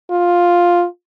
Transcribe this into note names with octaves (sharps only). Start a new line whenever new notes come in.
F4